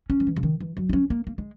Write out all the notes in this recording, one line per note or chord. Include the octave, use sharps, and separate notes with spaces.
C#4
D#3
E3
C#3
D#3
E3
F#3
D#4
C#4
A#3
A#3
G#3